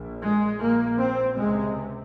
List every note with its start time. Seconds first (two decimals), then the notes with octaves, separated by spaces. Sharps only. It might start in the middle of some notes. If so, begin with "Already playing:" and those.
Already playing: A#1 A#2
0.21 G#3
0.60 A#1 A#2 A#3
0.99 C4
1.37 C#2 C3 G#3